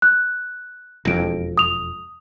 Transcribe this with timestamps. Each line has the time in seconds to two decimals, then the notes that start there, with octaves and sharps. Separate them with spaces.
0.02 F#6
1.05 E1 F2 A#6 D7
1.58 D#6 F7